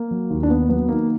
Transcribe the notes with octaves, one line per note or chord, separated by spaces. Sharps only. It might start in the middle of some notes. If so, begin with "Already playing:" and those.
Already playing: A#3
F#3
D#2
D4
D#2 B3
F#3 B3
D#3 A#3